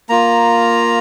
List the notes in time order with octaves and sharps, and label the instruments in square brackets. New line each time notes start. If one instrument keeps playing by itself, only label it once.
[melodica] A#3 F4 A#5